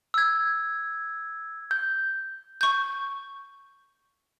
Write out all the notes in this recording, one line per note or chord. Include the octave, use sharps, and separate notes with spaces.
E6 G#6
G6
C#6 G6